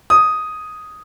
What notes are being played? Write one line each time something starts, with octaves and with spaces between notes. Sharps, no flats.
D#6